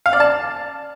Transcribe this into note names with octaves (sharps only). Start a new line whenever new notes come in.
F5
D5
A5